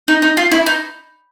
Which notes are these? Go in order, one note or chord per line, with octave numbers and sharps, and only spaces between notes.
D#4
D#4
F4
E4
D#4